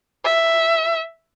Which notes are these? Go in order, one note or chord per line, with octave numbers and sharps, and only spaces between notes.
E5